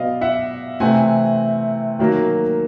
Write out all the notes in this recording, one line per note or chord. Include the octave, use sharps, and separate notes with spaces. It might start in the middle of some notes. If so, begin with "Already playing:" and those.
Already playing: B2 F#3 B3 D5 D#5 F5
E5 F#5
C3 E3 A3 C4 F#5 G#5
D#3 F#3 A#3